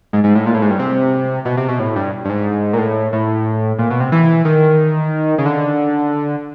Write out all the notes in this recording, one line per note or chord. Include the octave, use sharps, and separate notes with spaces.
G#2
G#2
A2
A#2
A2
G#2
G2
C3
B2
C3
B2
A2
G2
G2
G#2
A#2
A2
A2
A#2
B2
C3
E3
D#3
C#3
D3